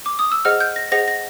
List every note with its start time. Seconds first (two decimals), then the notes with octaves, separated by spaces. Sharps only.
0.06 D6
0.19 D#6
0.32 E6
0.45 G#4 C5 D#5 F#5 F6
0.60 G6
0.76 A#6
0.92 G#4 C5 D#5 F#5 A#6
1.08 A#6